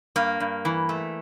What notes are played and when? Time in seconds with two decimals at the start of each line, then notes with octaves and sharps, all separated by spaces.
0.16 G2 A#3
0.40 G2
0.65 E3
0.89 A3